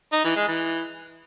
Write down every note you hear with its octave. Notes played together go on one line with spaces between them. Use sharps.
D#4
E3
G#3
E3